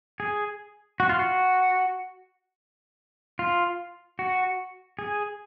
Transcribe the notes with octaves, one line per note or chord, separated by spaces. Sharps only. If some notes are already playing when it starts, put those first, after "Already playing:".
G#4
F#4
F4
F#4
F4
F#4
G#4